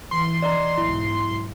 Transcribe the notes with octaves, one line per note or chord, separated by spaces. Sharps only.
E3 C6
D5 D#5 A#5
B1 G#2 E4